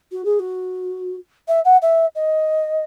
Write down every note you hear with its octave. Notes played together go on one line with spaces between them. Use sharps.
F#4
G#4
F#4
E5
F#5
E5
D#5